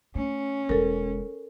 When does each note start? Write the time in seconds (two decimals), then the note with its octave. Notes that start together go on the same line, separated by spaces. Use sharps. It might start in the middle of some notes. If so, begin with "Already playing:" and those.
0.15 A3 C#4
0.69 E1 G#3 A4 A#4